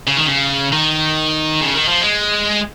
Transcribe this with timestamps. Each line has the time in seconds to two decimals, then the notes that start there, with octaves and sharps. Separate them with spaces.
0.07 C#3
0.17 D#3
0.26 C#3
0.72 D#3
1.61 C#3
1.74 D#3
1.88 F3
2.01 G#3